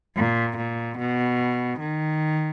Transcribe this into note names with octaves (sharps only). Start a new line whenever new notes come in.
A#2
A#2
B2
D#3